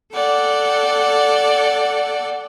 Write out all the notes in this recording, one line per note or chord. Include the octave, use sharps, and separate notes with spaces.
A4 D5 F#5 G5